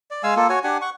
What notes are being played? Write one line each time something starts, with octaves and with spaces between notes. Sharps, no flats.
D5
G#3 F5 G#5 E6
A#3 F4 A4
F#4 C#5 G#5
D4 G4 F#5 G#5
F#5 C#6